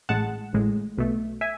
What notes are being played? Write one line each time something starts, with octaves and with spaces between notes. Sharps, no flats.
A1 A2 G#3 F#5 A5
A1 A2 G#3
B1 B2 A3
E5 G#5